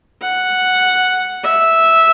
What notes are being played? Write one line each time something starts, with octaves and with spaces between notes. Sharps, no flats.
F#5
E5